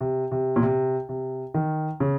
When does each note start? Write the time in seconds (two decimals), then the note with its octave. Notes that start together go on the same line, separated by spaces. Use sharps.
0.01 C3
0.31 C3
0.56 A#2
0.62 C3
1.09 C3
1.54 D#3
2.00 C#3